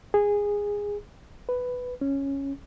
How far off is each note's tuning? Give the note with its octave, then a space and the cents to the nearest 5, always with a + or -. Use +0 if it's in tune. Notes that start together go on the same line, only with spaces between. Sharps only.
G#4 -15
B4 +10
C#4 -5